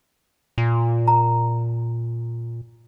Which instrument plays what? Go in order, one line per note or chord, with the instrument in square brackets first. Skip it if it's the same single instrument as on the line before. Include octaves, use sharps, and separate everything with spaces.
[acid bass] A#2
[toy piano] A#5